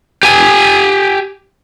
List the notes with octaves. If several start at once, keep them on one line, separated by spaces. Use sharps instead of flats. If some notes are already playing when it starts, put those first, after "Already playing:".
G4 G#5